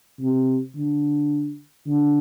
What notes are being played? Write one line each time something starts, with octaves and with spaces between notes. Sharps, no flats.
C3
D3
D3